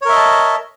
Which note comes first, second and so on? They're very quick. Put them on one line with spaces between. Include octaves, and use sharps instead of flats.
C#5 A#4 E5 D#5 A5